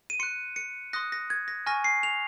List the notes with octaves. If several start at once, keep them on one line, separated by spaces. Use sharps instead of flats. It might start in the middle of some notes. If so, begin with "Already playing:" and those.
D#7
C6 F#6 C#7
C#7
C6 D#6 F#6 A#6
A#6
G#6
A#6
G#5 C#6 F6 A#6
C7
F7